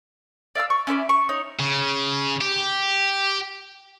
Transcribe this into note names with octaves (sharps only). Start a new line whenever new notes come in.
D5 E5 F5 E6
C#6
C#4 E4 C5 D5
C#6
D#4 C#5
C#3
G4